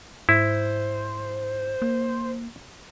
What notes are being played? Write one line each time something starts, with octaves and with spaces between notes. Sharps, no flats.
G#2 E4 C5
A#3